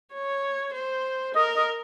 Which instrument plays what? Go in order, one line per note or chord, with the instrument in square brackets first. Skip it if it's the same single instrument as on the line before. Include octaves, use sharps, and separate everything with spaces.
[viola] C#5
C5
[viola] A#4 [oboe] D#5
[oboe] D#5